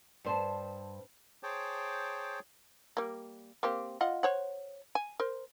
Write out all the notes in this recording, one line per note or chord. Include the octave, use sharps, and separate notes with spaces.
G2 C5 A5
G#4 C5 C#5 G5 A5 D6
G3 A#3
A#3 C4 G4
F4 D#5 F#5
C5 C#5 F#5
G#5
A#4 C5